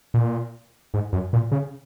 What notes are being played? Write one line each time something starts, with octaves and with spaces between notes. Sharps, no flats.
A#2
G#2
F#2
A#2
C#3